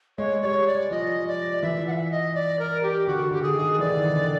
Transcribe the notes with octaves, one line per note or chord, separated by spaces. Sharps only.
G#3 C#5
G3 C#5 D5
D5
F3 D#5
D5
E3 E5
F#5
E5
D#5
D5
A#4
G4
D3 F#4
D3 G4
G#4
D#3
E3 D5
D#3
D3